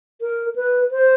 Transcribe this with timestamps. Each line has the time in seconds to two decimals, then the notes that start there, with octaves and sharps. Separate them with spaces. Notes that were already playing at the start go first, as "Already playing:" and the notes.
0.21 A#4
0.55 B4
0.91 C5